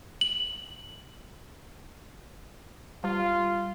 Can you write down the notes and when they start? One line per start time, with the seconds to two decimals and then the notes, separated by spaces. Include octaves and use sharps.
0.21 F#7
3.04 G3 F4